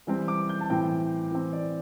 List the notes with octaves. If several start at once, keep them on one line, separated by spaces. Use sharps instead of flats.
E3 G3 C4
D6
G6
A5
A2 E3 C4 G5
E3 C4
D5